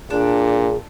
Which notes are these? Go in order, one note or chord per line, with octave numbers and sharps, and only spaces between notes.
A#2 D4 G#4